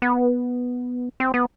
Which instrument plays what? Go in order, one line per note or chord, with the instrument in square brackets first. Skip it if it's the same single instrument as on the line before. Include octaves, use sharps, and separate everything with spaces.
[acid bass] B3
C4
B3